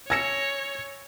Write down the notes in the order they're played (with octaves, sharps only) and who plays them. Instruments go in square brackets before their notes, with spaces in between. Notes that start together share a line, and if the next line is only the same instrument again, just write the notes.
[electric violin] C#5 [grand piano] G#5 E6 E7 [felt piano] G#6 A#6 C#7